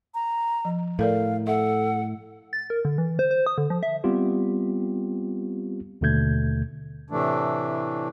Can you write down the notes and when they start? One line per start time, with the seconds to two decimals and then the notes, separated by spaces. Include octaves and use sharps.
0.14 A#5
0.65 F3
0.99 A2 A4 A#4 D5 F5
1.47 A4 E5 F#5
2.53 A6
2.70 A#4
2.85 D3
2.98 E3
3.19 C5
3.31 C5
3.46 D#6
3.58 D3
3.70 F3
3.83 E5
4.04 G3 B3 C4 F4 G4
6.01 D#2 B2 D3 A3 G6 G#6
7.10 A2 C3 E3 A3 D4